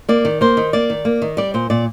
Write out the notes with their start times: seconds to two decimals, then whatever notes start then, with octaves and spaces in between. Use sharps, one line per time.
0.09 A#3 D5
0.25 D#3
0.41 A#3 C5
0.57 D#3
0.73 A#3 D5
0.90 D#3
1.05 A#3
1.22 D#3
1.37 G3 D5
1.54 A#2 C5
1.70 A#2 D5